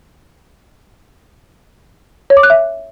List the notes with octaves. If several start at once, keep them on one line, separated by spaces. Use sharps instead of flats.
C#5
D6
F#6
E5